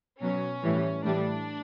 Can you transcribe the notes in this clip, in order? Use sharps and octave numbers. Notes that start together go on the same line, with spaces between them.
B2 F#3 C#4
A2 E3 G3
A2 E3 G3 D4